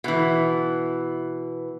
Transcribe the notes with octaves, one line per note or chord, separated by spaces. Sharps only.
B2 E3